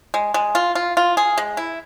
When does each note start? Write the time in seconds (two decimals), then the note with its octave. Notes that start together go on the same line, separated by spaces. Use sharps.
0.14 G#3
0.34 G#3
0.55 F4
0.75 F4
0.97 F4
1.17 G#4
1.38 G#3
1.57 E4